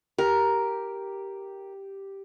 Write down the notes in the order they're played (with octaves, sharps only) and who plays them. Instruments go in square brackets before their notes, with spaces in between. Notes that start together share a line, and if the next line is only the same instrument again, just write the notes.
[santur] G4 [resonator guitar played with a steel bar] A#4